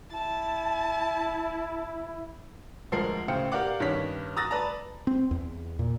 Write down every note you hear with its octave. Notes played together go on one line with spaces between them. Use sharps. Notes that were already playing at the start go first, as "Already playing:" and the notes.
E4 A5
D2 F3 G#3 A#4 C7
A2 C#3 C5 F5 G5 C#7
G4 A#4 D5 F5 F#5 D6
G2 D#3 C#4 C#5 B6
A#5 D#6 E6 F#6 A6 A#6
B4 D5 A5 A#5
C4
E2
A#2